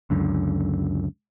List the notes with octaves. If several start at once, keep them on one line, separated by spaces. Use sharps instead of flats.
C#2 F#2 D3